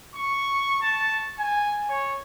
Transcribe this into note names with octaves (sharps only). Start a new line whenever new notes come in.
C#6
A5
G#5
C#5